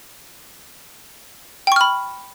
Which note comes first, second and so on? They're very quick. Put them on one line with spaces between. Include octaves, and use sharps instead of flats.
G5 C#6 F6 B5